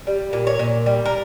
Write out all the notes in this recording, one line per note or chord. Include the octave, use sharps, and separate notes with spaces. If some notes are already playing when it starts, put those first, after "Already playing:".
G3
A#2
C#5
A#2
G3
A#4